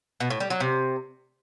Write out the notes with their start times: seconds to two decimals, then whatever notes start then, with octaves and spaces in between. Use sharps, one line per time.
0.20 B2
0.30 A2
0.40 G3
0.50 F#3
0.60 C3